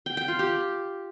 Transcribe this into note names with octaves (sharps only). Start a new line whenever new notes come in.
G5
G5
F4
G4